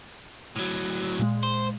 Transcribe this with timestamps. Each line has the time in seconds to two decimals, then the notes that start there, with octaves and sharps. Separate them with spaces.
0.56 A2 F#3
1.19 A#2 G#3
1.43 C5